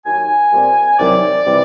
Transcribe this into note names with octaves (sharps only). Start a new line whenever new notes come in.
D#2 D#3 F#3 G#5
A#2 G3 C4
C2 C3 D#3 F#3 D5
C3 E3 G3